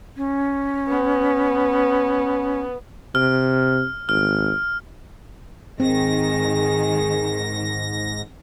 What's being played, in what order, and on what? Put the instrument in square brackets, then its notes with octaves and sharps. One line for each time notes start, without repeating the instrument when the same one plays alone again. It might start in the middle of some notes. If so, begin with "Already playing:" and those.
[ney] C#4
[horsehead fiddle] B3
[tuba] C3 [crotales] F6
[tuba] G#1 [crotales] F6
[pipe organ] G#2 A#6 [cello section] D#3 [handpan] C4 [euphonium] G#4